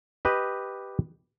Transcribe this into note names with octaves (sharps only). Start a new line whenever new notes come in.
G4 B4 D#5